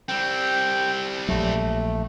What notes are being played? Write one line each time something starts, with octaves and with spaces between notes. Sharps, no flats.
G3 C4 G5
A#1 F#3 A3